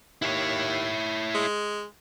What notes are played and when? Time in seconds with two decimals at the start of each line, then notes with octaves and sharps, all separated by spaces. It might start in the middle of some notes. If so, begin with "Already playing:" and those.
0.22 D#2 E4 C#5
1.35 G#3